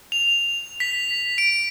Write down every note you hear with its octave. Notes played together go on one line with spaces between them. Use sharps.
F7
B6
D7